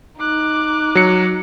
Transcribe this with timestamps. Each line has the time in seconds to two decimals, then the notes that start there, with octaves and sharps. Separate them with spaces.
0.19 D#4 D6 F#6
0.95 F#3 C#7